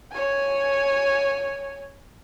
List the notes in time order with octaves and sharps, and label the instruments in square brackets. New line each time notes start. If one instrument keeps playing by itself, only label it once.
[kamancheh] C#5 G#5